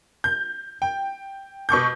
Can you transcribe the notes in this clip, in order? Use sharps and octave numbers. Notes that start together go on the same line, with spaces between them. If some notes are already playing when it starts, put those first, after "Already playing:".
G6
G5
B2 C#6 D6 G6